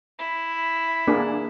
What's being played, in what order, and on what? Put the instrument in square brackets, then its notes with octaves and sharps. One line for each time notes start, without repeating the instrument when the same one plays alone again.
[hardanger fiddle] E4
[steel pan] A#3 D4 G#4